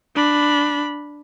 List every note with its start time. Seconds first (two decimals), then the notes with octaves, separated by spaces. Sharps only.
0.15 D4 B5